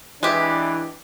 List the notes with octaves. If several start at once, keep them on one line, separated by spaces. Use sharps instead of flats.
E3 G#3 D4 G4